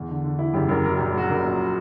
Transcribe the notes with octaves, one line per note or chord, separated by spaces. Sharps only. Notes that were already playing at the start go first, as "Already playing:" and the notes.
Already playing: E2
D3
D3
D3 E4
F#1 G4
F#1 A#4
F#3 A#4
G4
A#1
G4
F#3 F#4
A#1 A#4
A#2